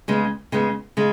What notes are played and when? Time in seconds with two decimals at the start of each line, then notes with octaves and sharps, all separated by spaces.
0.08 C#3 G#3 B3
0.52 C#3 G#3 B3
0.97 C#3 G#3